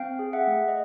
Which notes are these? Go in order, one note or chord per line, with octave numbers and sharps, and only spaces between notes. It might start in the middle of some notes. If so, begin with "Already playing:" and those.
Already playing: C4 F5 G5
G#4
E5 F#5
A3
D#5